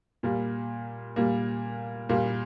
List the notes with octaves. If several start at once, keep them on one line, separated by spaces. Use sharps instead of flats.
A#2 G3 A#3
A#2 G3 A#3
A#2 G3 A#3